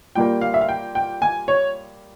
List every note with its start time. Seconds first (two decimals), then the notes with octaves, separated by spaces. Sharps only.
0.15 A#2 G3 A#3 G5
0.41 F5
0.54 E5
0.61 F5
0.69 G5
0.95 G5
1.22 G#5
1.48 C#5